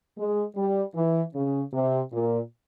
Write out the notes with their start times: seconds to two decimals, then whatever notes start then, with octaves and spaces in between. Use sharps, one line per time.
0.18 G#3
0.56 G3
0.95 E3
1.34 C#3
1.73 C3
2.12 A#2